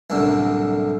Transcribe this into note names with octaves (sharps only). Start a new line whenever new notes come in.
C2 F#2 A2 D3